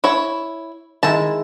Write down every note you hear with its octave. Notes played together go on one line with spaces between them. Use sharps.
E4 C#5
D#3 G#3 E4 A5